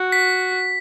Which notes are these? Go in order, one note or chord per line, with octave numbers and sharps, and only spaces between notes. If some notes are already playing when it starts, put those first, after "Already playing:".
Already playing: F#4
B6